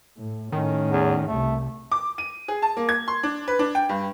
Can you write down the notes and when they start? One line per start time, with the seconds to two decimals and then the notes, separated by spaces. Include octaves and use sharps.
0.17 A2
0.52 A2 D#3 C#4
0.90 E2
1.28 C2 C3 A3
1.92 D6
2.18 D#7
2.48 G#4
2.62 A5
2.77 A#3
2.89 G#6
3.08 C6
3.23 D4
3.48 B4
3.59 D4
3.75 G5
3.89 G2